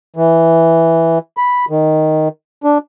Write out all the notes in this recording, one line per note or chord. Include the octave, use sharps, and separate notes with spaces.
E3
B5
D#3
D4